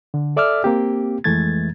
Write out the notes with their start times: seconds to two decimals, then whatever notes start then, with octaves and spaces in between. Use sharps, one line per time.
0.14 D3
0.36 A4 D5 E5 D6 E6 F6
0.64 A#3 C4 G4
1.24 F2 E3 G#3 A3 G#6 A6